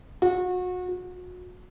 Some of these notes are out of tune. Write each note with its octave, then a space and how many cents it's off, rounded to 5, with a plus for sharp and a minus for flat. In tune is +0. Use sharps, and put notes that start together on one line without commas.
F#4 -30
F#4 -35